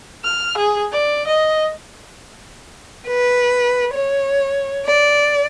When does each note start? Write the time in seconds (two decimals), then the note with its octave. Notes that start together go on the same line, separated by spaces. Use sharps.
0.24 F6
0.57 G#4
0.93 D5
1.27 D#5
3.07 B4
3.92 C#5
4.86 D5